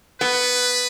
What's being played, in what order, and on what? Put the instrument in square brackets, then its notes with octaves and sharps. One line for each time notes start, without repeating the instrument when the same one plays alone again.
[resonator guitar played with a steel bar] B3 [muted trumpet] B4